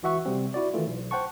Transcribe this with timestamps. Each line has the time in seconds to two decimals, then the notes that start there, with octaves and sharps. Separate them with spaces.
0.03 C#2 E3 F#4 E5 F#5 C#6
0.26 C3 G3 C4
0.54 E4 F#4 D5
0.73 D#3 E3 A3 F4
0.87 B1
1.11 C5 F#5 G5 A5 C#6